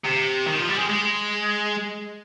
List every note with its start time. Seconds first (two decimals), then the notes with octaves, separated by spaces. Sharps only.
0.05 C3
0.46 D#3
0.58 F3
0.69 G3
0.79 G#3
0.90 G#3